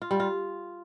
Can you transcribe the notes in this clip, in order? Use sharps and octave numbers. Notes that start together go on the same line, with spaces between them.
F4
G3
F4